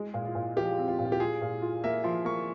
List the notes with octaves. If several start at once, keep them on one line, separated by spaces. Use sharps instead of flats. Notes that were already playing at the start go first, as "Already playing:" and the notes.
Already playing: G#3
A#2
F4
A#2
F3 G4
C4
F4
A#2
F4
G4
F4 G#4
A#2
F4
A#3 E5
F3 C6
A#3 C#6